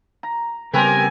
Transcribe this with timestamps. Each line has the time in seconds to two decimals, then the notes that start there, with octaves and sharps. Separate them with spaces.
0.23 A#5
0.73 C#3 G3 B3 C4 G4 A#4 B4 G#5